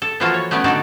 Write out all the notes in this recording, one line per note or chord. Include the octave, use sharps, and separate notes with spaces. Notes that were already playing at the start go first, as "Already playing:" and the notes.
A4
E3 F3 A#3 F4 F#4 A4
C#5
A3 B3 C#4 D5
D3 D#4 F#4 A4 D5 G#5